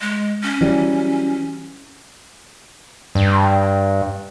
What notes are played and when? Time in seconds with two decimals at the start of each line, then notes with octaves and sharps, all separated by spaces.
0.01 G#3
0.43 C#4
0.61 E3 F#3 G3
3.15 G2